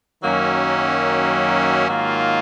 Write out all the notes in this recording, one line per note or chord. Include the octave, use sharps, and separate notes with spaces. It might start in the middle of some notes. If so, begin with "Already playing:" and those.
F#2 D#3 F#3 A#3 C#4
G#2 D#3 F#3 A#3 F4